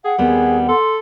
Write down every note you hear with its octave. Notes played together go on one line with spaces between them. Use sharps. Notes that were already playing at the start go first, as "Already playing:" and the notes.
G#4 F#5 G5
D#2 G3 B3 C4 G#4
A4 C6